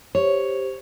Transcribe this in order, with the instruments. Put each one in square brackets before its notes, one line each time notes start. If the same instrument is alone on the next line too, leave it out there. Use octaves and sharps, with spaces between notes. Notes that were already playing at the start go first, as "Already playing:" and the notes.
[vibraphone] G4 C5 [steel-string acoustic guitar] C#5